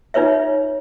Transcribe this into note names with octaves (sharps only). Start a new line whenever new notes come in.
D#4 F4 B4 C#5 E5